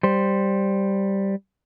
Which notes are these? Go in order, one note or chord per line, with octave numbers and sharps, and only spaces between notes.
G3 C5